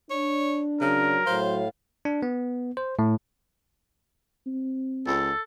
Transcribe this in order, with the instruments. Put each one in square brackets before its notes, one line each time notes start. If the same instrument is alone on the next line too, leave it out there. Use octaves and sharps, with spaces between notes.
[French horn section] D4 [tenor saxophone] C#5
[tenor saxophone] C#3 [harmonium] F#3 [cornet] A#4
[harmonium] A2 F5 [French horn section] F#3 [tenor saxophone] C5
[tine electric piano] D4
B3
C5
A2
[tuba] C4
[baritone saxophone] C#2 [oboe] A4